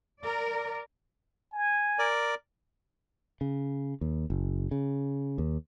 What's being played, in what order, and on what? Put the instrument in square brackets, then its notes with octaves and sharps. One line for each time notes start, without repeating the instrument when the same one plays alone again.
[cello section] A#4 D5
[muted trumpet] G#5
[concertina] A#4 D5
[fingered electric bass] C#3
D#2
F#1
C#3
D#2